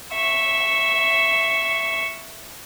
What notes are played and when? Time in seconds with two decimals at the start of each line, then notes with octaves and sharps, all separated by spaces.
0.13 E5 C#6